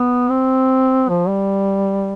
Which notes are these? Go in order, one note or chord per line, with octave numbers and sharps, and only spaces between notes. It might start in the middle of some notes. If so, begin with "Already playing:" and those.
Already playing: B3
C4
F3
G3